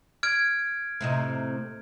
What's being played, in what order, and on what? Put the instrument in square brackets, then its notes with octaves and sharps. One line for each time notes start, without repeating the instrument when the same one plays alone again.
[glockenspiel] F6 G#6 D7
[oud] A2 C3 D#4